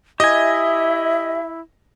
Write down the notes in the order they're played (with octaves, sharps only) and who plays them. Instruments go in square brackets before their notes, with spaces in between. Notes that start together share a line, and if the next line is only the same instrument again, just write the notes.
[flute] E4 [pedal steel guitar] G4 G#5 [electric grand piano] D#5 [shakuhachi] E5